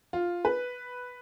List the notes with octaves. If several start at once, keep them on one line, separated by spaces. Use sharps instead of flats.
F4
B4